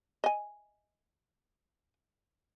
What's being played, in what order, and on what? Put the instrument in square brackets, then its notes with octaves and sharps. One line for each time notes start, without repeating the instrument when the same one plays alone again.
[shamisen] D#5 G#5